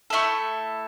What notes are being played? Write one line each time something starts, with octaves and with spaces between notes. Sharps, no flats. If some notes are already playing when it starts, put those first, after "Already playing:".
A3 C4 E4 A4